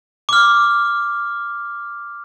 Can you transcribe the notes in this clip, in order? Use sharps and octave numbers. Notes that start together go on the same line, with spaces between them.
D6 F6